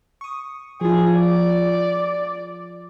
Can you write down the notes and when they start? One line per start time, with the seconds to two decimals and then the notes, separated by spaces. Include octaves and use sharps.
0.21 C#6 D#6
0.81 F3 F4 G#4
1.15 D5